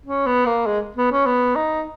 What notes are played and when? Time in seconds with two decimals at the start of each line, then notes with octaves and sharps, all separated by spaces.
0.06 C#4
0.27 B3
0.46 A#3
0.66 G#3
0.97 B3
1.11 C#4
1.26 B3
1.56 D#4